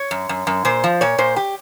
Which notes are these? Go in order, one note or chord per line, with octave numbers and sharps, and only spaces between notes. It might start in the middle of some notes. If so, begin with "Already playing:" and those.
Already playing: C#5
F#2
F#2
F#2
A#2 C5
F3
A#2 C#5
A#2 C5
G4